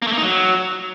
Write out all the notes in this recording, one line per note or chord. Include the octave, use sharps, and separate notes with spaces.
A#3
A3
A#3
D#4
F#3